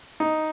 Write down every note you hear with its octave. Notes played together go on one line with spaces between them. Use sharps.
D#4